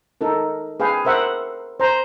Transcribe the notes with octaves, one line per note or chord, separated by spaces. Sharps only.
D#4 A4 A#4
G#4 B4 F5 G5
A#4 C5 E5 F#5
C5 A#5